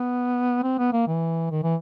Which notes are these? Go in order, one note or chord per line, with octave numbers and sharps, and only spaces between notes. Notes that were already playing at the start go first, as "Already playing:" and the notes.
Already playing: B3
C4
B3
A#3
E3
D#3
E3